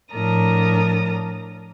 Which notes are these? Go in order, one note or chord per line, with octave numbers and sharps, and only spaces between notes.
A2 F3 D4 A#4 A#5 D#6